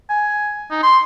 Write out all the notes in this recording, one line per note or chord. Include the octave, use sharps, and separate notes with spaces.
G#5
D#4
C6